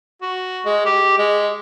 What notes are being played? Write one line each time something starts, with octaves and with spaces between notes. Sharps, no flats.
F#4
G#3
G4
G#3